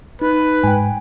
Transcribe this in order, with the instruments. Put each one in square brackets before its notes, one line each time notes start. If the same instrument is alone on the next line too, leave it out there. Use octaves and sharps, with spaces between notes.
[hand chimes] D#4 [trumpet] B4
[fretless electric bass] G#2 [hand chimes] G5 G#5